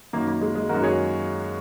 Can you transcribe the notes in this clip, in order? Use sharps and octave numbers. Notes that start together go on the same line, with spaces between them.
F#2 D#3 A#3
A#3
G#3
G#3
F#2 D#3 F#4 A#4
G#4 C#5